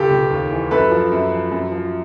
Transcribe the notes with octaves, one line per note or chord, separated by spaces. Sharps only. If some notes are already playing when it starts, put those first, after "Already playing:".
Already playing: C#2 G4 A4
C#2
D#2
E3
F#2 A4 B4
F3
F#2
F3
F#2
F3